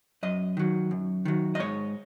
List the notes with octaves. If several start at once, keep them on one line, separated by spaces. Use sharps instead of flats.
F#2 D#5
D#3 F#3
F#2
D#3 F#3
D#5
G#2 C#5